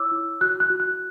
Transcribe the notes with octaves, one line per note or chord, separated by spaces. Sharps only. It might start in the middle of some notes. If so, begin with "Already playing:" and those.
Already playing: E4 C#5 D6 E6
E4
F#4 F#6
F#6
F#4
F#6